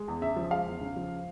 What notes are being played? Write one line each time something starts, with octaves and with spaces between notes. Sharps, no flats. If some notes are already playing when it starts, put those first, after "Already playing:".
Already playing: G#3
E2
C#3 E5
F3
G#3 F5
E2
C#3
F3